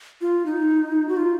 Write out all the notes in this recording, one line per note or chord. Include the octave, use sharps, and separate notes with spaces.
F4
D#4
F#4
F4